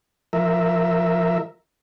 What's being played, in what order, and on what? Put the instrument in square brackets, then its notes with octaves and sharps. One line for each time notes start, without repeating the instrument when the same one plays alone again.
[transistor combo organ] F3 A#4 E5